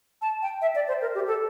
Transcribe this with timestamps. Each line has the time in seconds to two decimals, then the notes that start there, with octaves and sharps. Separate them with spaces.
0.22 A5
0.42 G5
0.61 E5
0.75 D5
0.88 C5
1.01 A#4
1.15 G4
1.27 A4